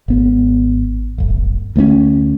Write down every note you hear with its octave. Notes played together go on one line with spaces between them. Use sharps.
G#1 B3
D1 G1
D2 A3 B3 C#4